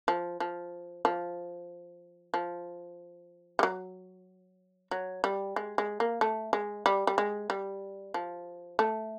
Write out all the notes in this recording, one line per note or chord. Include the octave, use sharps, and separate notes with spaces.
F3
F3
F3
F3
G3
F#3
F#3
G3
G#3
G#3
A#3
A3
G#3
G3
G3
G#3
G3
F3
A3